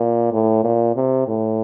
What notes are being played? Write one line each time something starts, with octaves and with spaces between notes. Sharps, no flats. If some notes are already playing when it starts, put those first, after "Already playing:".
Already playing: A#2
A2
A#2
C3
A2